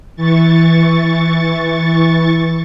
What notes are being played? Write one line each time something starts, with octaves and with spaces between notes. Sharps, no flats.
E3 C#6 A6